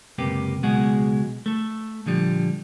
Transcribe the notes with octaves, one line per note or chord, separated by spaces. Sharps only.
C#2 F#2 C3 A#3 G4 B4
C#2 B2 F#3 G#3 G#4 F#5
A3 A4
A#2 D3 F3 G3